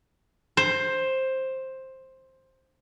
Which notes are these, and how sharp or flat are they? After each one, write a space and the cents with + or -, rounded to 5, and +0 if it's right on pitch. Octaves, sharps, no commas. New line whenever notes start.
C5 +10